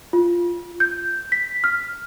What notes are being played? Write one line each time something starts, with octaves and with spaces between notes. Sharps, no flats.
F4
G6
B6
F6